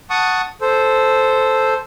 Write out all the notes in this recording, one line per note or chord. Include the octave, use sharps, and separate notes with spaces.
F#5 A5 C#6 D#6
A4 C5